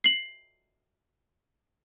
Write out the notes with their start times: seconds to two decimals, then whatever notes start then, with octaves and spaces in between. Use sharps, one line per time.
0.04 C7 F#7